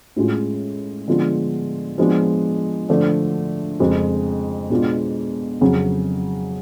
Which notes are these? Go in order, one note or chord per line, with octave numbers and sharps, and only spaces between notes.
A2 G#3 C#4 F4
D3 F3 G#3 B3 F4
F3 G#3 B3 D4
D3 F3 A3 D4
F2 C#3 G#3
B2 G#3 B3 D4 F4
F2 C#3 F#3